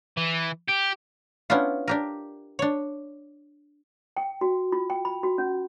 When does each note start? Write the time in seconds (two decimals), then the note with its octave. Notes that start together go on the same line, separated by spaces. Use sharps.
0.17 E3
0.68 G4
1.50 B3 C#4 D4 E4 F4
1.88 D4 G4 A#4
2.59 D4 C#5
4.17 G5
4.41 F#4
4.72 F4
4.90 G5
5.05 B5
5.23 F#4
5.38 C#4